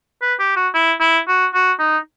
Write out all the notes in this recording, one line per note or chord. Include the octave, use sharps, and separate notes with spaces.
B4
G4
F#4
E4
E4
F#4
F#4
D#4